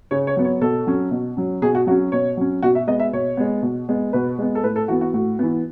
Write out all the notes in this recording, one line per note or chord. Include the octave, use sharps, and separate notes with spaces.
C#3 C#5
C#5
F#3 B3
C#5
B2 A4
F#3 C#4
B2
F#3 C#4
B2 G#4
F#4
F#3 C#4 F#4
B2 C#5
F#3 C#4
B2 F#4
E5
G#3 B3 D#5
E5
B2 C#5
G#3 B3
B2
G#3 B3
B2 B4
G#3 B3
A4
A2 B4
A4
E3 B3 F#4
F#4
A2 F#4
E3 B3